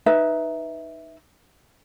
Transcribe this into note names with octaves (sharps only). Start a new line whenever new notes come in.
D#4 B4 E5